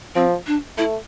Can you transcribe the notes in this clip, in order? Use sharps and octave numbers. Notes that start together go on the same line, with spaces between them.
F3 C4
D4
A3 E4